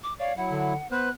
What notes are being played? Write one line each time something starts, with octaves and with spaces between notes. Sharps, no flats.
D6
C#5 D5 F5
F#3 E4 F#5
D3
B3 B4 C5 F#6